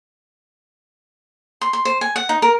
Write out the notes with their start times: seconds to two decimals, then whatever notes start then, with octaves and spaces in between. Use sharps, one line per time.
1.61 C6
1.73 C6
1.85 C5
2.01 G#5
2.16 F#5
2.29 D#4
2.42 A#4